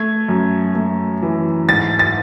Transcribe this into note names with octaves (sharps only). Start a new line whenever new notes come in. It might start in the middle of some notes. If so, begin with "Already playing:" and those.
Already playing: A3 G#6
F#2
A3
E3
G#2 A6
A6